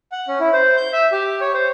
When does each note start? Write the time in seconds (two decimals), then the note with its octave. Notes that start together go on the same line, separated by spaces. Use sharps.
0.12 F#5
0.28 C#4
0.40 E4
0.53 C5
0.77 G6
0.93 E5
1.12 G4
1.41 C#5
1.54 C5